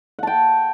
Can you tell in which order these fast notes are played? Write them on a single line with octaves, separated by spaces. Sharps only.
F#5 A5 G5